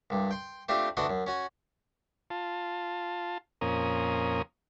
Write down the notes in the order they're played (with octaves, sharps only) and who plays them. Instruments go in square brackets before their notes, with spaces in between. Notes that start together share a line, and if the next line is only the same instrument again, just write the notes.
[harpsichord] C2 G2
G5 C6
A3 C4 D4 F4 G4
D2 E3 D4 F#4 D#5 C6
F#2
C#4 F#4 G#5
[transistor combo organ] F4 A5
F2 A#2 C#4 A#4 D#6